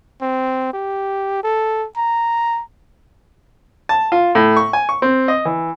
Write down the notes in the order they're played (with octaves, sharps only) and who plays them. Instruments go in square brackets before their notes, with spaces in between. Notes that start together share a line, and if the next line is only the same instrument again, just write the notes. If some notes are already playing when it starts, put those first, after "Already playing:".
[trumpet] C4
G4
A4
A#5
[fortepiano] A5
F4
A2
C#6
G#5
C#6
C4
D#5
E3